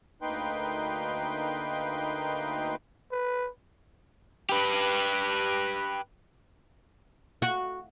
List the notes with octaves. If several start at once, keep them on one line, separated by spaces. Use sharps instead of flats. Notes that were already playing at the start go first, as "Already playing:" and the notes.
D2 A#3 D#4 B4 G5 C6
B4
G4 B4
F#4